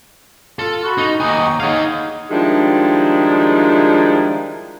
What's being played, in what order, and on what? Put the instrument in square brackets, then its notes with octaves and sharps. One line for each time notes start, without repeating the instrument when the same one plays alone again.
[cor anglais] F4 [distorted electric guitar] A4
[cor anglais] F#4 [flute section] A5 B5 C#6
[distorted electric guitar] D#4
[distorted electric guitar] D#2 G#5 [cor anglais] D#4 [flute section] A#5 C#6 D6
[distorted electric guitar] D#4 F5 [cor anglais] G#4 [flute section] C#5 F#5 A5
[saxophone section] D#3 F3 G3 G#3 D4 E4